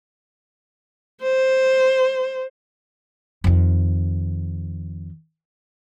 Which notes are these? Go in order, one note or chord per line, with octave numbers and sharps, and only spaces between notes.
C5
F2 D#3